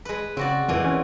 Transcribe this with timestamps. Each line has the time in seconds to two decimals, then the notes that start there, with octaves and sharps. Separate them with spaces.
0.05 G#3 B4
0.37 C#3 C4 F#4 D5
0.68 F2 A#2 E3 G#3
0.85 C#4